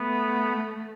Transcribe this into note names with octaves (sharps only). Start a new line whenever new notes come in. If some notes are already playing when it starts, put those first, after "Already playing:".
Already playing: A3 B3